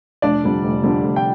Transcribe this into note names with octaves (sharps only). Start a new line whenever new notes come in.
F1 D4 D5
F2 D3 G3
F1
F2 D3 G3
F1
G5